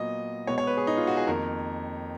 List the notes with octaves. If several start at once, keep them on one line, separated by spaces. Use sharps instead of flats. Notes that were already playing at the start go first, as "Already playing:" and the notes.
Already playing: A#2 F#3 B3 D#5
B2 G#3 B3 C#5
C#5
B4
G#4
D#4
F4
F#4
G#4
F2 D#3 A#3 A#4